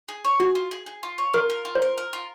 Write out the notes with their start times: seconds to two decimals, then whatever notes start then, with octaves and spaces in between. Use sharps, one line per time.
0.08 G#4
0.25 C#5
0.40 F#4 G#4
0.55 F4
0.71 G#4
0.86 G#4
1.03 F4
1.18 C#5
1.33 F4 A#4
1.50 A#4
1.65 F4
1.75 C5
1.82 A#4
1.98 A#4
2.13 F4